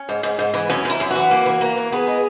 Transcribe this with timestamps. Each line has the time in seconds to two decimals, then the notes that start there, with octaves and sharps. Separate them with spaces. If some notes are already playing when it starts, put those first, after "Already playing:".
Already playing: C#4
0.09 G#2
0.23 G#2
0.39 G#2
0.54 E3
0.70 F#2 C#4
0.85 F#2 E4
1.00 F#2
1.11 E3 F#4
1.31 A#3
1.46 E3
1.61 A#3
1.77 E3
1.92 B3 G#4
2.07 G#3